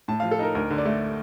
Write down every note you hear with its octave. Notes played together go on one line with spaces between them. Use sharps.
A2 A5
F3 F5
A4
D#4 A#4
D2 A#4
D3
D5
A3